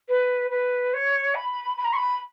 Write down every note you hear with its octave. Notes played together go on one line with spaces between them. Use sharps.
B4
B4
C#5
B5
B5
A#5
C#6
B5